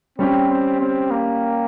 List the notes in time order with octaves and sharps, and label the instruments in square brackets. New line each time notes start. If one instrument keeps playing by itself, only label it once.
[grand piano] G3 C#4 G4 [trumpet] C4
[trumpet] C4
C4
A#3